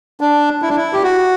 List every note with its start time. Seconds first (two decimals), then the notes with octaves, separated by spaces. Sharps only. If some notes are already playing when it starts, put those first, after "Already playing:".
0.21 D4
0.62 E4
0.69 D4
0.76 E4
0.93 G4
1.03 F#4